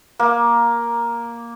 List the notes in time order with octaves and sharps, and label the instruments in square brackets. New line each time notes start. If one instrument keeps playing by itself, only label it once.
[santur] A#3